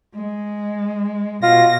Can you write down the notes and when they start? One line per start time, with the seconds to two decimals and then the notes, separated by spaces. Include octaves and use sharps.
0.14 G#3
1.43 B2 F4 A#6